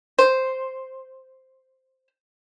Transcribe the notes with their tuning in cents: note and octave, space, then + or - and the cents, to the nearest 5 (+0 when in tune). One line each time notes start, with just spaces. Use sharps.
C5 +0